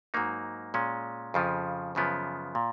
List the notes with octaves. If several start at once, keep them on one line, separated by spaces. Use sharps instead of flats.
G#2 F#3 A#3 D#4
A#2 G#3 C#4
F2 C#3 F3
F#2 C#3 F3 B3
A#2